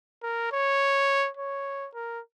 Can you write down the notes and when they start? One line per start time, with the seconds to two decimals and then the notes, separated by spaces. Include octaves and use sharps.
0.23 A#4
0.52 C#5
1.37 C#5
1.94 A#4